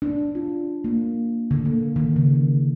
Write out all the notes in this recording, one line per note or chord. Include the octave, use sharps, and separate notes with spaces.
D4
F4
A#3
D3
A#3
D#3
C#3